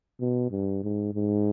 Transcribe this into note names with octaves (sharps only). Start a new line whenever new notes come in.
B2
G2
G#2
G#2